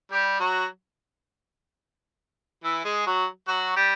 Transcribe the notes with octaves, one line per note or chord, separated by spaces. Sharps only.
G3 G4
F#3 F#4
E3 E4
G#3 G#4
F#3 F#4
F#3 F#4
G3 G4